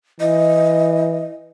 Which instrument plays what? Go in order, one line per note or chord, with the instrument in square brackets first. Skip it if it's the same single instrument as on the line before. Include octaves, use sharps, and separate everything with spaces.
[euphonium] E3 [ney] D#5